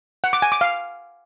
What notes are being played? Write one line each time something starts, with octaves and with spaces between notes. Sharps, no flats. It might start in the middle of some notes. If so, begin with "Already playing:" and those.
F#5
D6
G#5
D6
F5